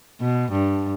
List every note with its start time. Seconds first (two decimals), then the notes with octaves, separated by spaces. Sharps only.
0.21 B2
0.52 G2